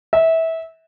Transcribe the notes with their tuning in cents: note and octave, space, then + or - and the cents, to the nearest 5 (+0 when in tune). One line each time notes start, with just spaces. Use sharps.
E5 -20